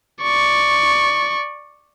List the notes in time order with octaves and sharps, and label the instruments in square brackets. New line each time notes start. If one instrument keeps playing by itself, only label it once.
[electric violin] D5 C#6